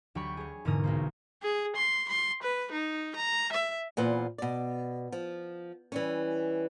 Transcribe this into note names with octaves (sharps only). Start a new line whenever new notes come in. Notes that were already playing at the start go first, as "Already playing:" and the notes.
D2 F#3 G4 G5 B5 C#6
G#4 C#5
E1 G#2 D3 A#4 D#6
B1 A#3 C5
G#4
C6
C6
B4
D#4
A#5
E5
E2 A#2 B4 C5
B2 D5
F3
E3 G3 C#4